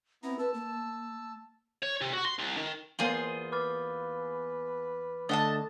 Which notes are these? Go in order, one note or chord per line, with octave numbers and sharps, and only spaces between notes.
B3 C4 E4 A#5
B4 A5 E6
A#3
C#5
C3
F#4
C6
C2
D#3
E2 A#3 B3 F4 G#4 C5 G7
B4 D6 F6 A6
D3 A3 D#5 F#5 A5 A6